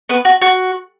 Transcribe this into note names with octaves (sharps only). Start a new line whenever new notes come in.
B3 B4
F#4
F#4